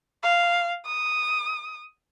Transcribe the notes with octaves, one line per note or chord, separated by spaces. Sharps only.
F5
D#6